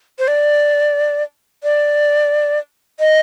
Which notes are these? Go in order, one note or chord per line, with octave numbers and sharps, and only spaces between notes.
C5
D5
D5
D#5